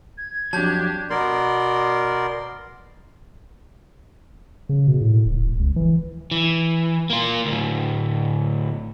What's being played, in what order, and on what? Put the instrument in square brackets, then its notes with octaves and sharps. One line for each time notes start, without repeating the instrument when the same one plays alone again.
[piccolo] G#6
[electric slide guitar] F2 F#3 [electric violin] D4 G4 [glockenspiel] A5 G6
[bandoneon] B2 B3 A#4 D5 C6
[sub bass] C#3
B2
A2
D1
D#1
C#2
E3
[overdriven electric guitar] E3
A#3 F4
D2 A2